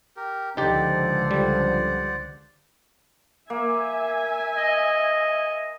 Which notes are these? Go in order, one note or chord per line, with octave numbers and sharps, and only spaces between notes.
G4 A#4
C#2 D3 F3 D#4 G4 C5 D5 F#5
G3
A#3 E5 G#5
D#5